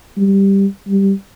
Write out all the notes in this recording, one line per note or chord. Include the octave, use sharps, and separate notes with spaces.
G3
G3